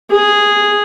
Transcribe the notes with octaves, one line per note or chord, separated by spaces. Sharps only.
G#4